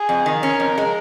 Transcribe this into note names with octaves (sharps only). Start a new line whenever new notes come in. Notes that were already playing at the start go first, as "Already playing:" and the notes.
Already playing: G#4
F2
D#3
C#4 A#4
F2
G#3